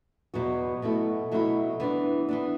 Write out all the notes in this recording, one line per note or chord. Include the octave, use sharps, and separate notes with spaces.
E2 B2 F#3 B3 F#4
B2 F#3 A3 E4
B2 F#3 A3 E4
E3 B3 D4
E3 B3 D4